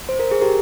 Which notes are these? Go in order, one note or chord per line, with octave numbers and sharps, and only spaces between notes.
C5
A#4
G#4
G4 A#4